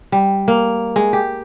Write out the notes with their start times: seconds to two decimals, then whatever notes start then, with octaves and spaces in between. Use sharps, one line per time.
0.12 G3
0.48 A#3
0.96 G#3
1.13 G4